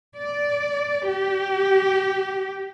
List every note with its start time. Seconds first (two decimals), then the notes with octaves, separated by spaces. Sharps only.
0.17 D5
1.08 G4